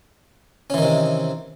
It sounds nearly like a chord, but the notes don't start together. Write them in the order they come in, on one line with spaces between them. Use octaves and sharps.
C#4 E3 D#3 C3